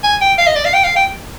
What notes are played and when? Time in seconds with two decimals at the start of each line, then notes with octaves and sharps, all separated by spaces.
0.03 G#5
0.21 G5
0.38 F5
0.47 D#5
0.56 D5
0.65 F5
0.74 G5
0.84 F5
0.96 G5